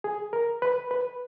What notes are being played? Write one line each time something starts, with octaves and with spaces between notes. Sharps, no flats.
G#4
A#4
B4
B4